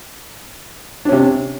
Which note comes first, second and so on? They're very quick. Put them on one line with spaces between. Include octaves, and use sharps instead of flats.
D4 C#4 C3